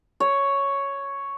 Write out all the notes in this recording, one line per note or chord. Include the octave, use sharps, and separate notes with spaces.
C#5